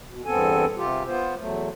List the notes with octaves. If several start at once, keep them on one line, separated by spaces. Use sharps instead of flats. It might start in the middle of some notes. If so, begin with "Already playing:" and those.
B2
E2 G2 B3 C4 A4 G#5
C3 F4 G4
B3 F4 C5
E2 F#3 A3